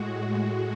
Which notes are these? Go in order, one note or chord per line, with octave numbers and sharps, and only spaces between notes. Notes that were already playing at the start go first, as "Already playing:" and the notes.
Already playing: A2 G#3 F#4